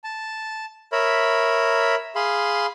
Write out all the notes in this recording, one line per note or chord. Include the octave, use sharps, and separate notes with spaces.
A5
A#4 C#5 E5 B5
G#4 F5 B5 C6